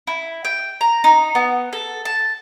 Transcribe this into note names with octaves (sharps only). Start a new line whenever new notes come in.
E4
G5
A#5
D#4
B3
A4
A5